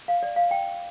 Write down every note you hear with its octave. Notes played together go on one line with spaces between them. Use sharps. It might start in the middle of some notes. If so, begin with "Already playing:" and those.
F5
D5
F5
G5